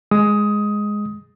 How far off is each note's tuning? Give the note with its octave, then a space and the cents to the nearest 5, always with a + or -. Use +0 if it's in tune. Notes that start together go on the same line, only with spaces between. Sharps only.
G#3 +0 D#6 +15